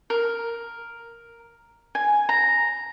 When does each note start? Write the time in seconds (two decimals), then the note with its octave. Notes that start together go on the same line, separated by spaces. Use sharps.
0.10 A#4
1.95 G#5
2.29 A#5